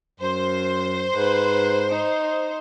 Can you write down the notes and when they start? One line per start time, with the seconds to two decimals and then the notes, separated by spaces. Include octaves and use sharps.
0.20 F#2 C5
1.15 G#2 B4
1.90 D#4